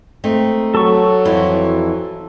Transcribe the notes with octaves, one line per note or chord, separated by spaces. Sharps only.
A3 C4 D#4
F#3 A4 C#6
F2 E3 E4